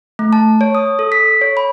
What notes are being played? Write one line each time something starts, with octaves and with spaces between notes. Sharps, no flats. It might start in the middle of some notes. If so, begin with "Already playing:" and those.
A3
A5
C#5
D#6
A4
B6
C#5
B5